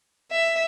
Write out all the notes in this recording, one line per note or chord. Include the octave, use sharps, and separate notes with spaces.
E5